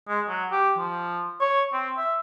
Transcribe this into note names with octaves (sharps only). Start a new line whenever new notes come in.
G#3
F#3
G4
F3
C#5
C4
E5